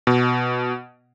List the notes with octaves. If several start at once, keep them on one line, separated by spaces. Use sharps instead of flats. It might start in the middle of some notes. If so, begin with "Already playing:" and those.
B2